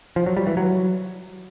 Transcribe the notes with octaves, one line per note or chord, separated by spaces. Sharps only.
F3
F#3
G3
E3
F#3